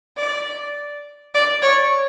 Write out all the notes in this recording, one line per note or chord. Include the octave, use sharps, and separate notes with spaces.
D5
D5
C#5